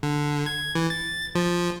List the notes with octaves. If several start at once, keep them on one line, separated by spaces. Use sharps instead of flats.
D3
G#6
E3
A6
F3